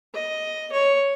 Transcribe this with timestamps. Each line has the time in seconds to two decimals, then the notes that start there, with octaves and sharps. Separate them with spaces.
0.14 D#5
0.72 C#5